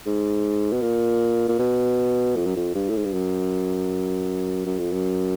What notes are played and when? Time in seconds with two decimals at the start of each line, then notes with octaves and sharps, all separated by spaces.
0.06 G#2
0.72 B2
0.82 A#2
1.49 A#2
1.59 B2
2.36 F2
2.46 F#2
2.56 F2
2.75 G2
2.89 A2
2.96 G#2
3.05 G2
3.13 F#2
4.66 F#2
4.79 F2
4.92 F#2